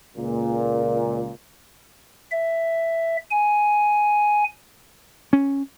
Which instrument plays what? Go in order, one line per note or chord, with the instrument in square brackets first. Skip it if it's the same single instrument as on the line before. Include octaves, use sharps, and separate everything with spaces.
[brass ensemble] C#2 A#2
[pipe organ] E5
G#5
[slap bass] C#4